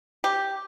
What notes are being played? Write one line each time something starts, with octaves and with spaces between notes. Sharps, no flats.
G4